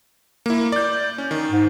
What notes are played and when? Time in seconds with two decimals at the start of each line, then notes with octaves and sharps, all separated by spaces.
0.46 A#3 E4
0.72 D5 G6
1.18 C#4
1.31 D#3
1.51 G#2